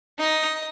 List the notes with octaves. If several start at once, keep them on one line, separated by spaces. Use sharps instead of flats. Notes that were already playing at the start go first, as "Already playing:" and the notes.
D#4 D#5